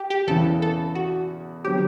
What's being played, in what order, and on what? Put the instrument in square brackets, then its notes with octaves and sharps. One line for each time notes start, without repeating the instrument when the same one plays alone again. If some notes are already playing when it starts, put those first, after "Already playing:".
Already playing: [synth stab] G4
G4
[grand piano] E2 C#3 E3 [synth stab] A4
[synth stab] A4
F#4
[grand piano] D3 F#3 B3 [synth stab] G4